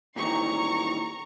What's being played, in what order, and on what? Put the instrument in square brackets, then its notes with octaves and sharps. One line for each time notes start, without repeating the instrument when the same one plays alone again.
[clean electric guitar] A#2 D#3 E3 [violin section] A#5 C#6